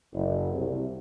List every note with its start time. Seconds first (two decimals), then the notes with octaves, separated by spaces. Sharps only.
0.13 F#1
0.54 C2